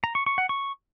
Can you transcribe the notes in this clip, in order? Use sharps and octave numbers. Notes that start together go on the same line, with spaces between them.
A#5
C#6
C#6
F#5
C#6